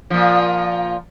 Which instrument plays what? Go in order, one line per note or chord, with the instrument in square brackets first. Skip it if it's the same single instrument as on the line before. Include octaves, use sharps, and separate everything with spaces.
[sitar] A#2 F3